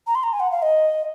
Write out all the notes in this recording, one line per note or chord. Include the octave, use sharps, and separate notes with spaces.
A#5
C6
A#5
G#5
F#5
F5
D#5